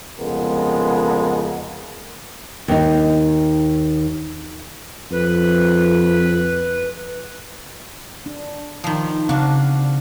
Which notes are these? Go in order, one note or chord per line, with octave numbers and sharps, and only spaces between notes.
C2 F2 C#3 G#3 B3 A#4
D#2 D#4
F2 B4
D4
D#3 F3
C#3 C4 D4 F#4 F5